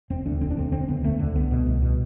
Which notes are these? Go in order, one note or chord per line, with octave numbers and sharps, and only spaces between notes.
E1 C4
D2 D3 D4
E1 C4
D4
D2 D3 C4
E1 C4
D2 D3 B3
E1 A3
D2 D3
C2 B3
B2
C2
B2